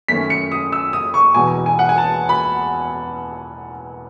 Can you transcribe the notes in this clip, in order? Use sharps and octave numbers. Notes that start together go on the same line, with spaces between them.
F#2 D#3 A3 C#4 B6
C#7
D#6
E6
D#6
C#6
E1 E2 B2 G#5
G#5
F#5
G#5
A5
B5